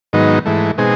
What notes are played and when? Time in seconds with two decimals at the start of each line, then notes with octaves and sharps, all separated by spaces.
0.13 G#2 D#3 F#3 B3 D#4
0.46 G#2 E3 A3
0.78 B2 G#3 C4 D#4 G#4